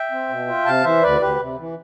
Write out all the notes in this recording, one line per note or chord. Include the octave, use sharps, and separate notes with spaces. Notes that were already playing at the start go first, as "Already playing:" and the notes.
Already playing: E5 G5
C4
B2
F4
C3 F5 A5
E3 C5 E5
D2 B4 D5
D2 G4 B4
C3
E3